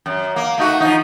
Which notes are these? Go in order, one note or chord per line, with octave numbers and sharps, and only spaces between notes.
F#2
A#3
A3 D#4 F#4
F3 D#4